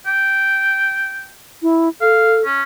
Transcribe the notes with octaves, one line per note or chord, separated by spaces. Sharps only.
G5
E4
A4 F5
C#4